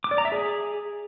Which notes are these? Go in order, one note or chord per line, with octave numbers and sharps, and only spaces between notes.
D6
D5
A#5
E5
G#4